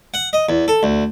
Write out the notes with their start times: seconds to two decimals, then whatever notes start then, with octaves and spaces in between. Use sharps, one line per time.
0.14 F#5
0.33 D#5
0.49 E2
0.68 A4
0.83 D2